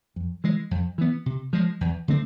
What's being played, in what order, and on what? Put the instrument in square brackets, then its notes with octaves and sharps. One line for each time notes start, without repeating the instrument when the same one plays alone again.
[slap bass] F2
E3 G#3
F2
E3 B3
C3
F3 G#3
E2
D3 A3 C4